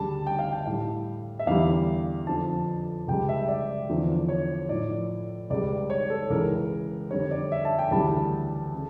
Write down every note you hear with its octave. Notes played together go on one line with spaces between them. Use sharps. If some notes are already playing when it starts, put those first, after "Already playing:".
Already playing: D2 C#3 G3 A5
G5
F5
G5
A2 G3 F5
E5
E2 D3 G3 F5
F2 D3 F3 A5
C#2 C#3 G3 G5
E5
D5
E2 D3 F3
C#5
A2 F3 D5
C#2 C#3 G3 D5
C#5
A4
C#2 C#3 E3 A#4
F2 D3 G3 C#5
D5
E5
A5
G5
D2 C#3 E3 G3 A5
C#3